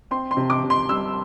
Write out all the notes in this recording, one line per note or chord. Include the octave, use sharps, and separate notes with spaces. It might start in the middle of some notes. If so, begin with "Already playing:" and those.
C4 C6
C6
C3
D6
C3
C6
G3 E6